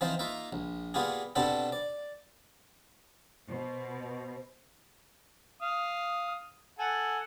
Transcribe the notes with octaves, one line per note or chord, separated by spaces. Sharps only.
E3 F3 C4 D#4 F4 C5
A#3 D#4 F4 E5
A#1
A#2 B3 F4 G4 G#4
B2 B3 C4 D4 G4 A4
D5
B2 C5
F5 D#6
A4 F#5 G#5